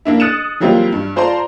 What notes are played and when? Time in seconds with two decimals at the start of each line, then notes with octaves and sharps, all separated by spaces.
0.05 A#3 D4 E4
0.20 D#6 F#6 A6 C#7 D#7 E7
0.60 E3 F#3 G3 A#3 C4 F4
0.93 G2
1.16 F4 C5 D5 A5 A#5 C6